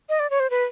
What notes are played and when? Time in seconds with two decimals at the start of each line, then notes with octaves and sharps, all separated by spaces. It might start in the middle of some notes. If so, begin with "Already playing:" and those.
0.09 D#5
0.20 D5
0.30 C#5
0.40 C5
0.50 B4